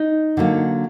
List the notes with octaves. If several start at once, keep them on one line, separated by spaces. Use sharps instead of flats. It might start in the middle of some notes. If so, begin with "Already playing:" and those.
Already playing: D#4
D3 F#3 A#3